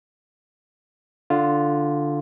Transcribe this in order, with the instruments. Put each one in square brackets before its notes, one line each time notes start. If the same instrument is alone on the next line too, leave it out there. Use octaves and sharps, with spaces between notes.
[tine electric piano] D3 F4